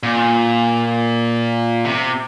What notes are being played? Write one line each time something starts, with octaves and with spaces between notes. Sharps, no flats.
A#2
C3